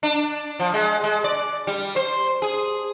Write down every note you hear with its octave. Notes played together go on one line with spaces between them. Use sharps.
D4
F3
G#3
G#3
D5
G3
C5
G#4